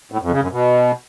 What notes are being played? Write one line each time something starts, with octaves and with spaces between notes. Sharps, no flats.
A2
F2
C#3
F#2
B2